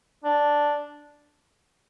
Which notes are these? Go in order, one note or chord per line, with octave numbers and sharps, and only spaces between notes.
D4